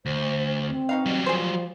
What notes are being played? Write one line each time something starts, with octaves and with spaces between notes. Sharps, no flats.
D2 C5
C4
B2 D#4 F5
F#3 G3
F3 G#4 C5